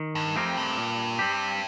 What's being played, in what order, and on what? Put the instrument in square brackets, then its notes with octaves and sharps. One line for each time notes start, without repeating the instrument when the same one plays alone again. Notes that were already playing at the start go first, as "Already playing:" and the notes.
Already playing: [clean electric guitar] D#3
[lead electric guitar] G2
[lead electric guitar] F2 [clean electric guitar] A3 C4 G4 A#4
[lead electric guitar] G2
[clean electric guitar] A#2
G3 C4 G4